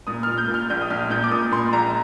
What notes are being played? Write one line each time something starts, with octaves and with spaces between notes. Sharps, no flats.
A#2 D#6
F6
A#2
G6
A#2
F6
A#1 G6
D#6
A#1 F6
A#2 G6
D6
A#2 D#6
A#2 C6
A#1 A#5